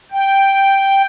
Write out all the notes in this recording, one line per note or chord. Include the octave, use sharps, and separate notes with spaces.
G5